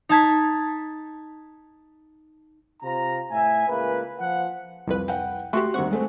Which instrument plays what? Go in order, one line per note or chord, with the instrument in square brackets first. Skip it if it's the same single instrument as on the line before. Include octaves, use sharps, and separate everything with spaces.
[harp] D#4 A5 G#6 B6
[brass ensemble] C3 C4 F4 A#5
A2 E5 G#5
C#2 A#3 B4
F3 F#5
[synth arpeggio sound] C2 F2 B4
[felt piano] F#5 G5
[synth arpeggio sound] A3 F#4 G4 [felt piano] C6 C#6 F#6
[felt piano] D#2 G3 C4 [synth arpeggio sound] F#5 C#6
[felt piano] G#3 A3 C4